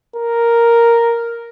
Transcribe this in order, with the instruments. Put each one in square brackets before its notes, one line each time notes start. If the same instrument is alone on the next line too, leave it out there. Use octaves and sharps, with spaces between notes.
[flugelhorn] A#4